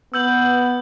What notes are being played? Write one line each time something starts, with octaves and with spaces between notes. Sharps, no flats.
B3 E6 G6 F#7